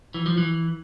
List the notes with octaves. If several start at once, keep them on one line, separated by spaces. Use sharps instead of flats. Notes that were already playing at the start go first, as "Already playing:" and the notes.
E3
F3
E3